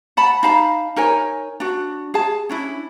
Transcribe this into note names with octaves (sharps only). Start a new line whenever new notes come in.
F#5 A5 B5
D#4 F5 A5 B5
D#4 A#4 C#5 G#5
D4 F#4
G#4 A5
C#4 D4 E4